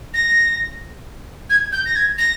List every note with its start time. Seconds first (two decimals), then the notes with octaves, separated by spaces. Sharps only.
0.14 A#6
1.50 G#6
1.72 G6
1.86 A#6
1.96 G#6
2.18 A#6